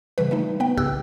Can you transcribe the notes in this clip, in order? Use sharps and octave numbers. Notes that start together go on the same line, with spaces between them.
C#3 E3 G3 B4
G3 A3 D#4
B3 B4 G5
C#2 G#2 C#3 G4 E6 F#6